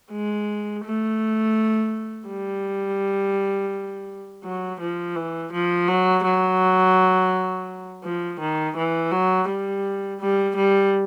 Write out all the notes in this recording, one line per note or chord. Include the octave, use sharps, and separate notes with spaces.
G#3
A3
G3
F#3
F3
E3
F3
F#3
F#3
F3
D#3
E3
F#3
G3
G3
G3